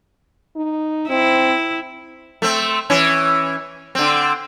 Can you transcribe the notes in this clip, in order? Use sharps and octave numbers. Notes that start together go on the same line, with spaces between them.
D#4
C4 E4
A3 C4
E3 C#4
D3 C4